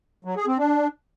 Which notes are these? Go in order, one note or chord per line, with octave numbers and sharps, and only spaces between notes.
F#3
G#4
C4
D4